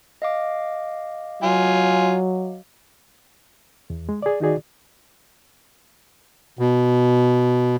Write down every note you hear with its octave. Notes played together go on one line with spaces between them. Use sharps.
D#5 F5 D6
F#3 F4 G#5
E2
G#3
G#4 D5
D#3 D#4 F#4 G#4 D5
B2